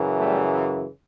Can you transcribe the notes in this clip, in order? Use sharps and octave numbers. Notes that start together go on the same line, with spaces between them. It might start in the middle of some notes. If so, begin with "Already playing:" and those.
Already playing: F#2 C#3 E3
G3 A3